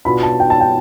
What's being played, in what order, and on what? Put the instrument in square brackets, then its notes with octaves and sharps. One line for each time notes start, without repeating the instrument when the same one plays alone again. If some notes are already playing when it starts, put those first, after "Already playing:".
[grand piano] B2 B3 D4 F4 [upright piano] B5
[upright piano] A5
G5
A5
G5